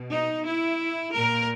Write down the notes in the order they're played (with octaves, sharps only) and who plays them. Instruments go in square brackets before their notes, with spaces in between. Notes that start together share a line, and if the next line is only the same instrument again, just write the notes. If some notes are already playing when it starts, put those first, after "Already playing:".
Already playing: [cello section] B2
D#4
E4
A#2 A#4